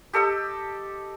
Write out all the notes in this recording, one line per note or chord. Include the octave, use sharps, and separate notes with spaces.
G4 A4 D#5 E6